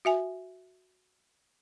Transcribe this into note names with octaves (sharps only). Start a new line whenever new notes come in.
F#4 E5 G#5